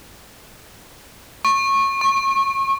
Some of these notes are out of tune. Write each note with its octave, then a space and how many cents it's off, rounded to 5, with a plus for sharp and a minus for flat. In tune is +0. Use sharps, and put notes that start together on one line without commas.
C#6 -20
C#6 -35